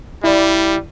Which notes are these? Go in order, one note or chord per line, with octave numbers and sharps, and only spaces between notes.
G3 E4 D5